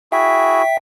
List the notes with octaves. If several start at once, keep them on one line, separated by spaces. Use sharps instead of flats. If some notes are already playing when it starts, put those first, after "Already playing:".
E4 F#4 G#4 E5 G5 B6